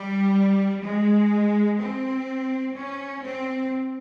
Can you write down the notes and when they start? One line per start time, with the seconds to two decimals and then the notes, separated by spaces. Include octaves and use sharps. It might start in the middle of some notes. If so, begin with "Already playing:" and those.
Already playing: G3
0.82 G#3
1.79 C4
2.75 C#4
3.23 C4